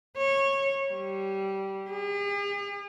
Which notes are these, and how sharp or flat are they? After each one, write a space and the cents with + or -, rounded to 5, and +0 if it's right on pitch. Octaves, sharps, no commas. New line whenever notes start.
C#5 -20
G3 -15
G#4 -45